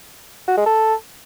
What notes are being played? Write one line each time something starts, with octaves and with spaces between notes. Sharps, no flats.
F#4
G#3
A4